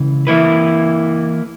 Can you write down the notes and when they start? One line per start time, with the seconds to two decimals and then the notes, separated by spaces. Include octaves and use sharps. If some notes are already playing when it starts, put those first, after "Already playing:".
Already playing: C#2 C#3 E3
0.27 E3 A#3 E4 B4